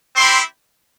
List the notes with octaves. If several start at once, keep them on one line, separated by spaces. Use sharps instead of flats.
C4 E4 G4 C6